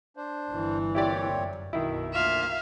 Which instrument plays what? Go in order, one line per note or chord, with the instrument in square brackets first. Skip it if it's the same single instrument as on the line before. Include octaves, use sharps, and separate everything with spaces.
[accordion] D4 C5
[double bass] G1 E3
[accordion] A#2 C4 C#5 [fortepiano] E4 G4 D5
[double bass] F#2
[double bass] B1 F#2 [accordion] B2 [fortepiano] D#3 E4
[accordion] D2 A#3 F4 [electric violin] E5 F5